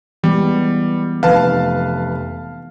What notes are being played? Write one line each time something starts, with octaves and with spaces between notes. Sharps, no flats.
E3 G3 G#3 B3
F1 B4 F5 A5